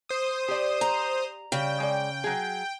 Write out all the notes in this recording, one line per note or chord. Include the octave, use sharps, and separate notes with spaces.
C5 D#6
G4 D5
A#5
C#3 G3 G5
G#3 D5
F#3 G#4